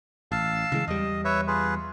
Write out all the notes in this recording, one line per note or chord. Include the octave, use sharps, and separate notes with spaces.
A1 F5 A5 E6
C#3 E3 G#3
E2 G3 D#5
B4 C#5 E5
F4 G#4 B4